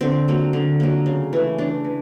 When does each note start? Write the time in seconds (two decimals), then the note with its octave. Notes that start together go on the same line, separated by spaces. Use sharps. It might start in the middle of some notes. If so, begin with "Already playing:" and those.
0.01 D3 C4
0.28 F#3 A#3
0.53 D3
0.80 F#3 A#3
1.06 C#3
1.33 E3 A3
1.58 C#3 D4
1.84 E3